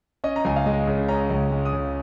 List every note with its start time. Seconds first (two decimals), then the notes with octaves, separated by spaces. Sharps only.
0.24 C#4 D#5
0.36 A#5
0.45 C#2 G#5
0.56 F5
0.66 G#3 D#5
0.87 C#3
1.08 C#4 A#5
1.30 C#2
1.51 G#3
1.65 D#6
1.73 C#3